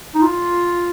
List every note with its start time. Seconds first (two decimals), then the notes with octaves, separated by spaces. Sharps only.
0.14 D#4
0.22 F4